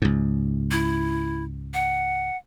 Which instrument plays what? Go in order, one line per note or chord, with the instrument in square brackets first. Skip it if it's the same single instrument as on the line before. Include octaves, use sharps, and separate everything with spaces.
[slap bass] C#2 G#2
[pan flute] E4
F#5